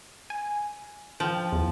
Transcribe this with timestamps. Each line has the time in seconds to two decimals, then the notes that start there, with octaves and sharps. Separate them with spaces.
0.30 G#5
1.20 F3 G5
1.52 E2